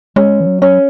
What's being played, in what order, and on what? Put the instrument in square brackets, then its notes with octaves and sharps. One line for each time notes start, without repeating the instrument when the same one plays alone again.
[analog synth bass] G#3 [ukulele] C#4
[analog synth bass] E3
F#3
[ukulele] C#4